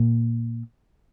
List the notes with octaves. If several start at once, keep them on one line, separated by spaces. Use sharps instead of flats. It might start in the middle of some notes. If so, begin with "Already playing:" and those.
Already playing: A#2